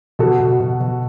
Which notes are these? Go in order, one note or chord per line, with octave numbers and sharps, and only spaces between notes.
B2 F#4 A4
B2
B2
B2